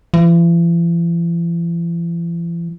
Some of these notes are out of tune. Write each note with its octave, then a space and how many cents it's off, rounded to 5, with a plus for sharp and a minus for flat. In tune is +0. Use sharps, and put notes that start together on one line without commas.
E3 +45